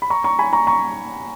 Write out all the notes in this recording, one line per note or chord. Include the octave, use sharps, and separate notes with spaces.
B5
A#5 C#6
A#5 C#6
G#5 B5
A#5 C#6
A#5 C#6